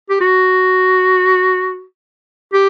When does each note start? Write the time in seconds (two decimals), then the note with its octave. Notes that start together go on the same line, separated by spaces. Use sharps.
0.10 G4
0.21 F#4
2.54 G4